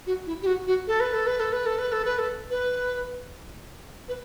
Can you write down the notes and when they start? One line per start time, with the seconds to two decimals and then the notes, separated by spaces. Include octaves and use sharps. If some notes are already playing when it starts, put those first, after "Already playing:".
0.07 F#4
0.27 E4
0.42 G4
0.46 F#4
0.67 F#4
0.87 A4
1.00 B4
1.13 A4
1.27 B4
1.40 A4
1.53 B4
1.66 A4
1.79 B4
1.92 A4
2.05 B4
2.18 A4
2.50 B4
4.08 B4